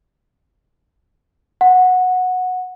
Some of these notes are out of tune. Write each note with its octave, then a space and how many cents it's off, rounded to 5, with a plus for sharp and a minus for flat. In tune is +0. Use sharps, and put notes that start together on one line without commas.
F#5 -10